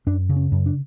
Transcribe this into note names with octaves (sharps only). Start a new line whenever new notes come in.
F#2 D4
C#3
C#4
F#2
D4